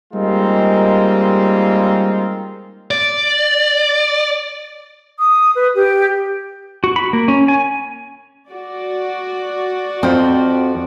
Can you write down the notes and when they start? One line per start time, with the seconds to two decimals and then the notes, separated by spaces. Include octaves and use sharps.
0.13 G3 G#3 A#3 C4 D#4 F4
2.91 D5
5.19 D#6
5.55 B4
5.75 G4
6.84 F#4
6.96 B5
7.13 A#3
7.28 C#4
7.48 G#5
8.52 F#4 D5
10.03 F2 F3 C4